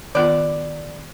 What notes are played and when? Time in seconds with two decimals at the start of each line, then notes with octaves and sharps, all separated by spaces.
0.15 D#3 B3 F4 D5